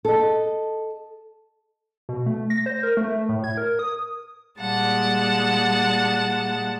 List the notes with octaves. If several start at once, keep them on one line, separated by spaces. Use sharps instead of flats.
A4 D#5
B2
A3
A#6
C5
A#4
A3
A2
G#6
A#4
D#6
A#2 G3 G#3 F#5 A5